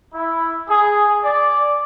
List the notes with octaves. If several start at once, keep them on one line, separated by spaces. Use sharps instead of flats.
E4
G#4
D5